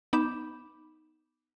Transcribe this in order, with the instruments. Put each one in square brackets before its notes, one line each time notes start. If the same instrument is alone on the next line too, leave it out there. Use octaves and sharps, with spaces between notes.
[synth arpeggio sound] B3 D#4 B5 D6 G6 E7